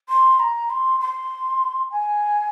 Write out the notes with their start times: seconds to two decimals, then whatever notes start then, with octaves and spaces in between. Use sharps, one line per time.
0.09 C6
0.40 A#5
0.70 C6
1.00 C6
1.91 G#5